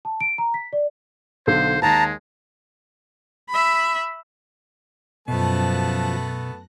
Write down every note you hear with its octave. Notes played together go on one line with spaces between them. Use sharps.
A5
D7
A#5
B6
D5
B1 D3 C5
D#2 G#3 A5 A#5
E5 B5
F#2 B2 F3 A3 B3 A5 F#6 A#6